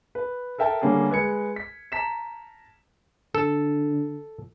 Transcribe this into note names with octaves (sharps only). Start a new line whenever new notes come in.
B4
A4 A#4 E5 G5 A5
D3 G3 A#3 C#4 G#4
G#3 B4 G#6 C#7
B6
A5 A#5 B6 E7
D3 A4